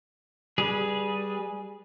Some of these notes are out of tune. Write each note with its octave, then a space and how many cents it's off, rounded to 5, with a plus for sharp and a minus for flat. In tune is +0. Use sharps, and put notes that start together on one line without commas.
G3 +0 G#4 +0 B4 -20